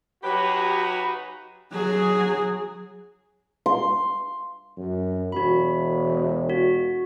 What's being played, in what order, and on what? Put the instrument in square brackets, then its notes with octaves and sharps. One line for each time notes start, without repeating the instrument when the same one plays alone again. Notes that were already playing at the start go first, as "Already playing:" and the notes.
[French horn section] C#3 D#4 F#4 [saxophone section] F#3 G4 [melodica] B4 B5
[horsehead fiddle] F#3 G#4
[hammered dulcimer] C6
[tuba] F#2
[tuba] E1 [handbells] F#4 B5
[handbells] F#4